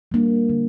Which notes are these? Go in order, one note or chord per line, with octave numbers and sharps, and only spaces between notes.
G3 A#3 D4
D3